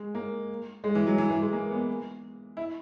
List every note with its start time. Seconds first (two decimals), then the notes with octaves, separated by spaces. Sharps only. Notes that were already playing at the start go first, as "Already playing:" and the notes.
Already playing: G#3
0.15 A#3
0.84 G#3
0.95 E3
1.07 F#3
1.18 E3
1.30 E3
1.42 G#3
1.53 A#3
1.71 B3
2.57 E4